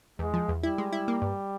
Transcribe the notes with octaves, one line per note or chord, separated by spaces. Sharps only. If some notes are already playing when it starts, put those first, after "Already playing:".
E2 G#3
F3
E2
G3 E4
G#3
E4
A#3
G2